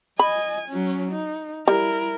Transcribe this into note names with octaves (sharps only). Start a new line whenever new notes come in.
D#5 G#5 B5
F#3 C#4
D#4
G3 E4 A#4